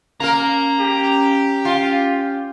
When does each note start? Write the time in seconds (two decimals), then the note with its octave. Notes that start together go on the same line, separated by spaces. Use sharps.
0.20 A#3 C#4 A#4 A#5
0.79 G4
1.65 F4